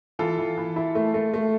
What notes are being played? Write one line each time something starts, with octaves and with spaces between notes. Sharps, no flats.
E3 F4 A4
E3
E3
E4
A3
A3
A3